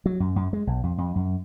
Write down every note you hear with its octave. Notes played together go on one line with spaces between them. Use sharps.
F#3
F#2
F#2
G#3
B1
F2
F2
F#2